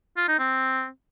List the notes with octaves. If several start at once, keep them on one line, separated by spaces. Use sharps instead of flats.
F4
D#4
C4